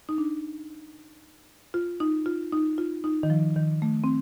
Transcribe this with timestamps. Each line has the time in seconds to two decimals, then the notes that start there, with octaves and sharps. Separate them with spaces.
0.09 D#4
0.18 D4
1.74 F4
2.00 D#4
2.26 F4
2.53 D#4
2.78 F4
3.04 D#4
3.23 D#3
3.30 F3
3.56 D#3
3.82 A3
4.04 C4